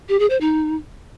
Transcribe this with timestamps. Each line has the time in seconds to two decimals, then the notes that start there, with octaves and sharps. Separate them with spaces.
0.09 G4
0.19 G#4
0.30 C5
0.41 D#4